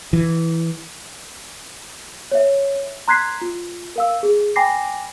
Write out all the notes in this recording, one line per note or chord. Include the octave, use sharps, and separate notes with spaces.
E3
C#5 E5
A#5 C6 F#6 G#6 B6 C7
F4
A#4 F5 E6
G#4
G5 G#5 B5 D6 A#6 C7